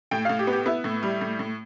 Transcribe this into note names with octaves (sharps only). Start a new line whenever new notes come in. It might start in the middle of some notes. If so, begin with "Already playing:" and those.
A2 G5
A2 F5
G4
B3
G4
B3 E4
A2
G3
A2
A2